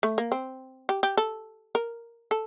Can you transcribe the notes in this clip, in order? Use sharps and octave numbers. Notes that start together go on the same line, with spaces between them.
A3
A#3
C4
G4
G4
A4
A#4
A4